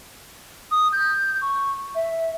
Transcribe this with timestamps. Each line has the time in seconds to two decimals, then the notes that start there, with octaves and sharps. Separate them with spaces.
0.72 D#6
0.93 G6
1.42 C#6
1.95 E5